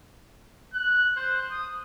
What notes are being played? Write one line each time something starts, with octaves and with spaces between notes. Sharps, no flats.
F#6
C5
D#6